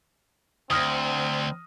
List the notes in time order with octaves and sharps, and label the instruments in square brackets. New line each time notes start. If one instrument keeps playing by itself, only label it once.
[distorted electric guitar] D2 [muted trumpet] C4 [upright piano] D#6 F6 A#6